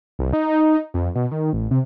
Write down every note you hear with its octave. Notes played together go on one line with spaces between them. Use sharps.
C2
D#4
F2
B2
D#3
A1
C3